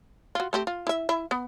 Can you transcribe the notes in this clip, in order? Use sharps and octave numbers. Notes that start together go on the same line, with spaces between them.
F4 F#4
A3 C4 G4
F4
E4 E5
E4 E5
B3